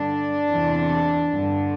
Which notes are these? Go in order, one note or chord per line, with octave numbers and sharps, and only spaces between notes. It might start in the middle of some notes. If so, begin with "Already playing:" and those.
Already playing: G2 D3 D4
E2 C3 E3
G2 D3